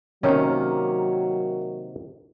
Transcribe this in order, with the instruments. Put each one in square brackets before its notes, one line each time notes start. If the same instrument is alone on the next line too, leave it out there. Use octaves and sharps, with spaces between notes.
[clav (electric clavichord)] C3 D#3 A#3 [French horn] F#3 [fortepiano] C#4